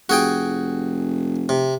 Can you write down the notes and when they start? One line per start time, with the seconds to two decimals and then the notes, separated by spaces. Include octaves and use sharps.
0.09 F1 F#4 G#4 G5
1.49 C3